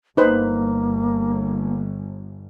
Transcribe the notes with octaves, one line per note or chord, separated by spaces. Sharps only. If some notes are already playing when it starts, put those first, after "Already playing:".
G1 A#3 D#4 B4 C5